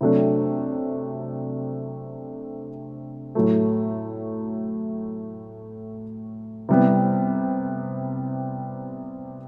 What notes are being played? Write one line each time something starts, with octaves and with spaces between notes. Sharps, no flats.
C3 F#3 A3 D4
A2 F#3 A3
C3 G3 B3 E4